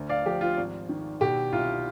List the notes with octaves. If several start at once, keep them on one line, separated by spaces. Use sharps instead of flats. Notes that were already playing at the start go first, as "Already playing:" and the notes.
Already playing: D2
D5 F5
F3 G4
F4
G#1
D#3
B2 G4
C2 F4